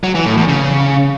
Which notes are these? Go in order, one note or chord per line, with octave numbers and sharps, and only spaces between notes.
F#3
E3
A2
E2
C#3